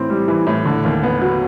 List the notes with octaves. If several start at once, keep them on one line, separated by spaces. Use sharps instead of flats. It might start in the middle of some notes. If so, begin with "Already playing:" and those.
Already playing: A2 E3 C4
G3
E3
A2
D3
D#2
B3
F#3